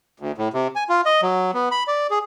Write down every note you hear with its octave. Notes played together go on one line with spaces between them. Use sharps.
D2
A2
C3
G#5
F4
D#5
F#3
B3
B5
D5
G#4